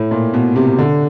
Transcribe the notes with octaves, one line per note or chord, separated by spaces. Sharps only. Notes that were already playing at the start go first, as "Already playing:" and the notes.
Already playing: A2
A#2
B2
C3
D3